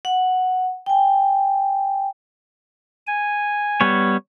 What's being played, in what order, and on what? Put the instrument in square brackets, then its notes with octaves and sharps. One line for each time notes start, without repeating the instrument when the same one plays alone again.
[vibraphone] F#5
G5 G#5
[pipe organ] G#5
[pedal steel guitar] G3 B3 C#5